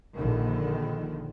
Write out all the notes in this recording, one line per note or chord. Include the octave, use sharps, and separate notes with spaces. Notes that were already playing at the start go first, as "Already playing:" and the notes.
A#1 D3 D#3